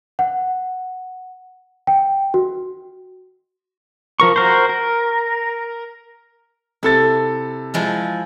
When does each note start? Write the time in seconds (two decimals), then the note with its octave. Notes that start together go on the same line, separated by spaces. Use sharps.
0.19 F#5
1.87 G5
2.34 F#4
4.20 F3 A#4 C#6
4.36 F#4 A#4 C5
4.69 A#4
6.83 C3 E4 A4 A6
7.74 F3 G#3 E4